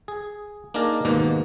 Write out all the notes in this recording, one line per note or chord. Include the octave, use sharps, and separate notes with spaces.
G#4
A#3 D4 D#4 G#4 A#4 D5
D#2 G#2 B2 A#3